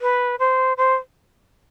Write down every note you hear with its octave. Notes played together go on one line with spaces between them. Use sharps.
B4
C5
C5